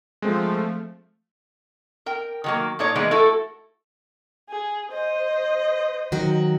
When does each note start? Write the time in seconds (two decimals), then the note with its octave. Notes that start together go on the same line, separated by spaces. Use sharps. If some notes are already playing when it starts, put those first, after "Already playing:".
0.22 F3 G#3 A3 C4
2.06 A#4 G5
2.44 D#3 F#3 A#3
2.79 A#2 D4 D#4 C#5 D5 A#5
2.95 E3 G#3 A#3 B3 D#4
3.11 A3 E4 F#4 A4
4.49 G#4
4.92 C5 D#5
6.12 D#3 F#3 F#4